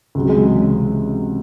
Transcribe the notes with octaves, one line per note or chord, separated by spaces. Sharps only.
C#2 C3 F#3
G#3
E3
C#3
C3